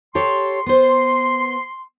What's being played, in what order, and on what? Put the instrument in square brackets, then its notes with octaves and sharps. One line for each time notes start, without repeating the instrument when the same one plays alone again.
[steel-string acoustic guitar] G4 A4 C#5 [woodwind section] C6
[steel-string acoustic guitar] B3 C5